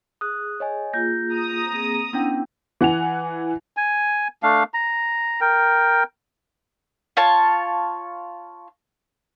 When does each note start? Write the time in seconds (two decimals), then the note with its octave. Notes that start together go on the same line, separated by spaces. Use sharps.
0.21 G#4 D#6 F#6
0.60 C#5 D#5 G#5
0.93 A#3 F4 G#4 G6 A#6
1.34 A#5 D#6
1.73 A#3 C4 G#4
2.13 B3 C#4 D4 E4 F#5 G5
2.81 E3 F#5 G#5 F7
3.77 G#5
4.43 A3 D4 F5
4.74 A#5
5.41 A#4 G5
7.17 F4 C#5 A5